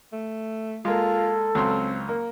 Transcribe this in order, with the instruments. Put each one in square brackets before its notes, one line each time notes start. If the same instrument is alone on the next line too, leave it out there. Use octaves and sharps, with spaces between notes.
[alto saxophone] A3
[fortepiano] G#3 A#3 [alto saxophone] F4 [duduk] A4
[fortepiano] C#2 F#3 C6 [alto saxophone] C4
[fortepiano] A#3